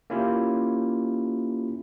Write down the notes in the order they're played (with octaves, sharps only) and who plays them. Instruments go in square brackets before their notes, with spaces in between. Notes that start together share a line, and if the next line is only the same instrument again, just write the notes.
[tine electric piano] A#3 C#4 E4 F4 G4